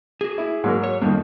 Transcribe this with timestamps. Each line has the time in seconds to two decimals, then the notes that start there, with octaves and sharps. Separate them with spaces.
0.21 F#4 G#4
0.38 E4
0.64 G#2 F#3 A#4
0.84 C#5
1.02 F2 D#3 G3 A#3